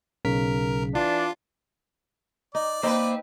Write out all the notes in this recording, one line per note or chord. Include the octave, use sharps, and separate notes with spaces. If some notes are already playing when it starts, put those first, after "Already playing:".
B1 C#3 A#4 B6
E3 D4 F4
D#4 D5
A#3 C4 D#4 B4